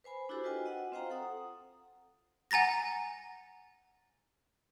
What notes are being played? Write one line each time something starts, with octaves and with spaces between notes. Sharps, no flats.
B4 C5 G#5 B5
D4 E4 F#4 G4 A4 C5
F4 F#4 B4 D#5 G5 G#5
D#5 F#5
C4 F4 C5 F5 G5 A#5
A4 F#5 D#6
F#5 G#5 A#5 A6 A#6